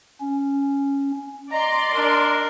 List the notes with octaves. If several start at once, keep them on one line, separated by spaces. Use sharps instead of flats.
C#4
D5 D#5 A#5 C6
D4 A#4